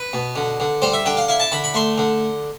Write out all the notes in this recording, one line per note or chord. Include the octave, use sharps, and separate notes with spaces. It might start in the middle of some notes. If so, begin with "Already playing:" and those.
Already playing: B4
B2
D3
D3
G3 C5
E5
D3 G5
F5
E4 F5
A5
D3 B5
B5
A3 C6
D3